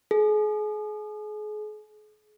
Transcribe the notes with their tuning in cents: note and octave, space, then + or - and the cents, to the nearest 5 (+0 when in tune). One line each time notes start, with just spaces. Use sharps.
G#4 +35